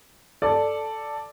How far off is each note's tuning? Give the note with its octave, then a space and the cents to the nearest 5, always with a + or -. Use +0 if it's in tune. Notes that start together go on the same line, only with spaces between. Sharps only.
A4 +0 D5 +0